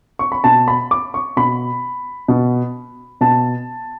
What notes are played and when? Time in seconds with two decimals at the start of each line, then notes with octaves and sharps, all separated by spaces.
0.19 C#6
0.32 B5
0.44 B2 A5
0.68 B5
0.91 D6
1.14 C#6
1.37 B2 B5
2.28 B2
3.21 B2 A5